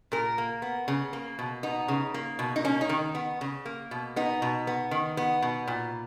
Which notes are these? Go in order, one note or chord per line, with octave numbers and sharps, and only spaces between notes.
A#2 A#4
A#3
B3
C#3
A#3
B2
B3 D#4
C#3
A#3
B2
D#4
A#3 C#4
D#4
D#3
B3
C#3
A#3
B2
B3 D#4
B2
B3
D#3
B3
B2
A#2